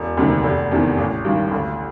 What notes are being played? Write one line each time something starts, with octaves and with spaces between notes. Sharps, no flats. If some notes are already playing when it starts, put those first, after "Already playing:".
Already playing: E1
D2 C3 D#3
F1
E2 C3 D#3
A1
G2 D#3
D2